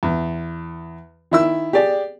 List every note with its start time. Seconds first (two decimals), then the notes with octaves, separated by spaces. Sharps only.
0.03 E2
1.31 D#3 E4 E6
1.73 G4 G#4 D5